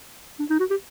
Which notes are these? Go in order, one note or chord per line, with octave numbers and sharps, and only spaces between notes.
D4
D#4
F#4
G4